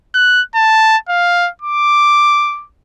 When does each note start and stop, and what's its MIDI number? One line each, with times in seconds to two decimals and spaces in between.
0.15 0.41 90
0.55 0.97 81
1.09 1.49 77
1.62 2.65 86